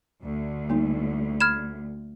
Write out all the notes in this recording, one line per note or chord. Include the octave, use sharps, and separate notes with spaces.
D2
G3 A#3 D#4
B5 F6 G#6 E7